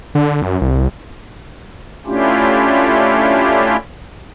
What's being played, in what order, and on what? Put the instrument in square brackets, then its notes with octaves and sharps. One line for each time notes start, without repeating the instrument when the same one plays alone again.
[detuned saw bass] D3
F#2
C2
[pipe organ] A3 C#4 D4 E4 F4 G4